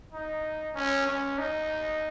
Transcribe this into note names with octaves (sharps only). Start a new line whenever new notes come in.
D#4
C#4
C#4
D#4